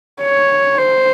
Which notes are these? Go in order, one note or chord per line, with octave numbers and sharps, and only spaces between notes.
C#5
C5